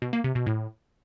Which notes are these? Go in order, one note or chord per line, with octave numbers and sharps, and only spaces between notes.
B2
A#3
C3
B2
A2